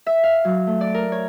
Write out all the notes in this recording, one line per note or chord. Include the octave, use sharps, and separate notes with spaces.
E5
F5
F#3
A3
D5
A#4
C#5